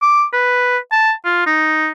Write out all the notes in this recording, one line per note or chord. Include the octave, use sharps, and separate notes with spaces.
D6
B4
A5
F4
D#4